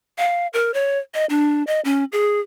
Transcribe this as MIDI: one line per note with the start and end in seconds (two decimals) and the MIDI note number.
0.18 0.47 77
0.53 0.73 70
0.74 0.99 73
1.14 1.26 75
1.30 1.63 62
1.67 1.80 75
1.85 2.04 61
2.12 2.40 68